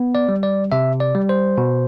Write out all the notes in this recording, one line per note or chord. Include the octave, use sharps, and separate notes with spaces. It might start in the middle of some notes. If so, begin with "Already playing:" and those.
Already playing: B3
D5
G3
D5
C3 E5
D5
G3
C5
B2